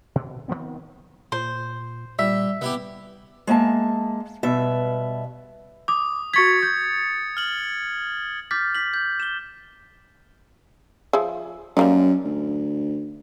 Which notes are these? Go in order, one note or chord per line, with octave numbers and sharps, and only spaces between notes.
B2
D#3 F#3 B3 C4
A#2 C5
A#2 G3 E5
C3 B3 E4 G4
G#3 A#3 E5 A5
G2 B2 B4 E5
D6 D#6
F#4 C#6 G#6 A6 B6 C#7
G6
F6 F#7
D6 F6 G6 A6 B6
B6 F#7
G6
E7 G7
F3 G#4 E5
F#2 G3 A#3 D#4
D2